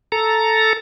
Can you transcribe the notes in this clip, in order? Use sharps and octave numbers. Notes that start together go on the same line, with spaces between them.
A4 A#5